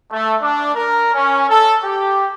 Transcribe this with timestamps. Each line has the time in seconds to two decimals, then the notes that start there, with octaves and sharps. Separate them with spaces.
0.11 A3
0.41 D4
0.75 A#4
1.14 C#4
1.50 A4
1.83 G4